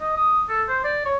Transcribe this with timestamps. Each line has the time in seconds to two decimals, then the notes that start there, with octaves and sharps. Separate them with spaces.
0.01 D#5
0.16 D#6
0.49 A4
0.68 C5
0.84 D5
1.05 C#5